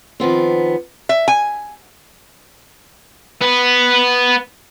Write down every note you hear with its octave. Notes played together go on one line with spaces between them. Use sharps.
D#3 F3 B3 C4
E5
G#5
B3 B4